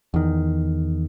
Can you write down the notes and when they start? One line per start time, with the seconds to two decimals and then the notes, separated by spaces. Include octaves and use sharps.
0.14 E2 D#3